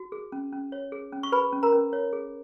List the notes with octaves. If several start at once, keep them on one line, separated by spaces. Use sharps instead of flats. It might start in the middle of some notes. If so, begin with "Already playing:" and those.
Already playing: F#4
G#4
C#4
C#4
C#5
G#4
C#4
C#6
G#4 B4 B5
C#4
A#4 A#5
C#4
C#5
G#4